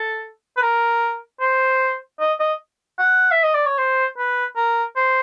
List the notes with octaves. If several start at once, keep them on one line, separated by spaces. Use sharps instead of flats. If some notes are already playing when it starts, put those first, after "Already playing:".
Already playing: A4
B4
A#4
C5
D#5
D#5
F#5
E5
D#5
D5
C#5
C5
B4
A#4
C5